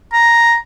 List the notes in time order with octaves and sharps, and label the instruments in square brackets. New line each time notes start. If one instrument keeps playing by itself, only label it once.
[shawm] A#5